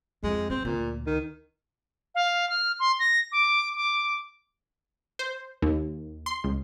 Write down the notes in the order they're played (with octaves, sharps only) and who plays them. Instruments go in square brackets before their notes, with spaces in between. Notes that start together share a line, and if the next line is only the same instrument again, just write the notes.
[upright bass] F2 [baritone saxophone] G#3
[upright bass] F#3 [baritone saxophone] C4
[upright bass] D2 [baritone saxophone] A#2
[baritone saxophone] D#3
[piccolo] F5
F6
C6
A#6
D6
D6
[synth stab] C5
D#2
C6
C#2